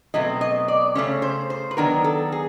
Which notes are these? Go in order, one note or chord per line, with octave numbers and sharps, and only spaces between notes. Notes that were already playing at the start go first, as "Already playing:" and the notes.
B2 F#3 A3 C4 D#5
D#5
D5
C#3 F3 A3 C#4 C#5
C5
C5
B4
D#3 F#3 B3 D4 A#4
A4
G#4